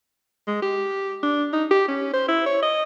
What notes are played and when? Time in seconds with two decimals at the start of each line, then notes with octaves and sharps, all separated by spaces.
0.47 G#3
0.62 G4
1.23 D4
1.53 D#4
1.71 G4
1.88 C#4
2.13 C5
2.28 E4
2.46 C#5
2.62 D#5